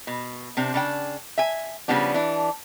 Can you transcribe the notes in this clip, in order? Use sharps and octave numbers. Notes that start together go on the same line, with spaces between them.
B2
C3 C4 D4
C#3 D4 G5
E5 G#5
C#3 F3 G3 B3 D4
E3 D4